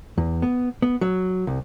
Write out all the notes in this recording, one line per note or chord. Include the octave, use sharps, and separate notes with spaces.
E2
B3
B3
F#3
C2